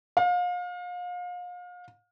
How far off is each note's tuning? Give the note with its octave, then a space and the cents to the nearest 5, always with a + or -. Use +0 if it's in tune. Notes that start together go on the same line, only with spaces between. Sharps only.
F5 +35